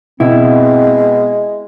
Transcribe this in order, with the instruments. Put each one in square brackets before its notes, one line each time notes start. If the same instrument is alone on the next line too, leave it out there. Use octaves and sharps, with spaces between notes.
[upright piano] B2 [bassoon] G#3 [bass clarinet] C4 [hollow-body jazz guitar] E4